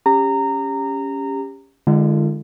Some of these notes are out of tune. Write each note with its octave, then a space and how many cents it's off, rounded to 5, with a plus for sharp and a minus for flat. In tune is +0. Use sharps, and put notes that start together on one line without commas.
C#4 +0 G4 +20 A#5 -20
D3 +30 G#3 +0 F4 -40